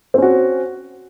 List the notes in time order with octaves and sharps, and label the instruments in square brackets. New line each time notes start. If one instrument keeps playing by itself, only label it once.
[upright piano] C4
C#4
F#4